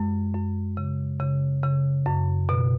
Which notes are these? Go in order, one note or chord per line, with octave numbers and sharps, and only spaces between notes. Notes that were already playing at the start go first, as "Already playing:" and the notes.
Already playing: F#2 G#3
F#2
C#3
C#3
C#3
F#2
B2